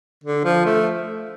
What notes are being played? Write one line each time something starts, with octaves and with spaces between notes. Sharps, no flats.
D3
F3
A3